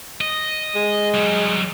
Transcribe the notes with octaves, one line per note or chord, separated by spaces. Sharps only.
D#5
G#3
F#3 G3